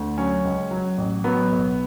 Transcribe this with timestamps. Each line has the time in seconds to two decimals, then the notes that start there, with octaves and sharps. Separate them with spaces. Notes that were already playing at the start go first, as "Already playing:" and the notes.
Already playing: D2
0.18 F#3 C#4
0.45 C#2
0.71 F#3
0.98 A1
1.24 F#3 B3
1.52 B1